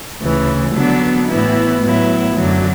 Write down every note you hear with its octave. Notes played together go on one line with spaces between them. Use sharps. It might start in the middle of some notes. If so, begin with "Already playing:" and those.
D2 C#3 E3
D3 F#3 B3 D4
A2 E3 B3 E4
A2 F#3 B3 E4
F#2 D3 F#3